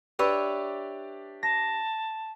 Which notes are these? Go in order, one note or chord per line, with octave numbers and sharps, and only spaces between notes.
D4 G4 B4 C#5 D5 E5
A5 A#6